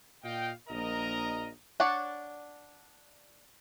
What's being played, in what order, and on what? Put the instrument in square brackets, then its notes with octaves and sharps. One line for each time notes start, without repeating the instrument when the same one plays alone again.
[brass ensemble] A#2 F4 D#5 F5 G5
A#1 A#4 D#5 A#5
[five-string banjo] D4 C#5 D5 F#5 A5